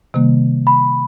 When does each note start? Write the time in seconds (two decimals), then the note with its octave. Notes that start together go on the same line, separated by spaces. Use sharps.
0.14 C3 D#3 G3 A#3
0.67 B5